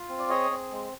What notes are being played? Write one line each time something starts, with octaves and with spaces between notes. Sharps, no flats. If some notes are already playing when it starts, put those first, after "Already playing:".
Already playing: F4
C4
D5
G#4 C#5 D#5
C4
G#3